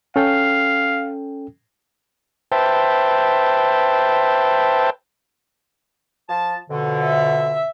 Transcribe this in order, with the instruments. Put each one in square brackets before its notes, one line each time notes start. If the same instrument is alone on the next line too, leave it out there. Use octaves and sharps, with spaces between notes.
[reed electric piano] C#4 A4 G5 [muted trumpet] F5
[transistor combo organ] B4 C5 E5 G5 A5
[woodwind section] F3 A5
F2 B2 D3
[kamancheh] E5